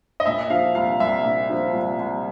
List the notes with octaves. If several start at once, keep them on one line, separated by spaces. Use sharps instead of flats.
D#5
A#2 E5
F3 F5
C2 F5
C2 E5
A#2
F3
C2
C2